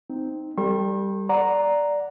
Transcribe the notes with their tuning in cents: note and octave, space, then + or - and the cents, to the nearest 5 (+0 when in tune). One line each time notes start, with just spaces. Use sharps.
C4 +0 D#4 +0
G3 +0 A4 +35 C#6 -45
D5 +0 F#5 -5 A#5 +0